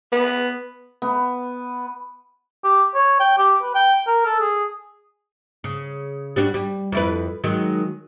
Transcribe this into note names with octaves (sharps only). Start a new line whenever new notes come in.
B3
B3
G4
C#5
G5
G4
B4
G5
A#4
A4
G#4
C#3
G3 D4 F#4
G3
F2 E4 B4
D#3 F#3 G#3